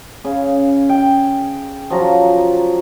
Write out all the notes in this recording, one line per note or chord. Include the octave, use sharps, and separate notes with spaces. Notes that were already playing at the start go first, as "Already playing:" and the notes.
C#3
G5
F3 F#3 A#5